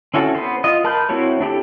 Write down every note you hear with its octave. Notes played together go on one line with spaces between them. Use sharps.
C4 C#4 E4 F#4 A4
B3 C5
F4 D#5
A#4 A5 B5 C6 G6
C4 E4 F#4 C#5
D4 E4 G4 A4